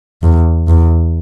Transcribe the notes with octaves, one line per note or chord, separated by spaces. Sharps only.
E2
E2